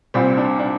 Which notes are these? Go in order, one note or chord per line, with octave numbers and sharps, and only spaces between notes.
C2 A#2 G3 C4
D4
D4